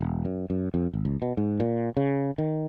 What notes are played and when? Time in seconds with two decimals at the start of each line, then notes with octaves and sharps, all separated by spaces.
0.01 E1
0.25 F#2
0.50 F#2
0.74 F2
0.94 G#1
1.05 C#2
1.22 B2
1.37 G#2
1.60 A#2
1.97 C#3
2.38 D#3